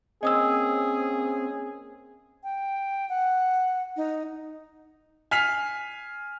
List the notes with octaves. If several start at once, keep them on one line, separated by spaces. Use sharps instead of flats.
A#3 C4 C#4 G#4 D#5 D#6 E6
G5
F#5
D#4
G#5 F6 B6 C7 F7